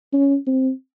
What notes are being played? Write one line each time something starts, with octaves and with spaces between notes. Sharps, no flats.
C#4
C4